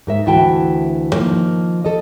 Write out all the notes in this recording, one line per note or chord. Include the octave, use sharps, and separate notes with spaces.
G#2 A#4 E5
D2 E3 E4 F#4 G5 A5
D#3 F3 A#3
A4 D#5